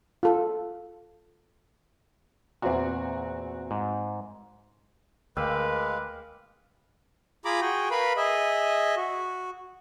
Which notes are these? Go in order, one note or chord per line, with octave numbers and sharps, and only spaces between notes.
F4 A4
E2 A#2 C4 F#4
G#2
D2 G#3 A#3 B4 F5 G5 E6
F4 G#4 A#5 B5 D6
F#4 G#4 G5
A#4 B4 F5 B5
G#4 D#5 E5
F#4